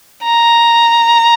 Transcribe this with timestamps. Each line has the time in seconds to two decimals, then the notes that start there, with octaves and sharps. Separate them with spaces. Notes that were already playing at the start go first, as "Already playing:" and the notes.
0.24 A#5